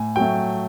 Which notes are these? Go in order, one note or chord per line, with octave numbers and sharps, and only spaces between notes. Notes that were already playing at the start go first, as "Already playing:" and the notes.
Already playing: A2 G#5
F#3 A3 G5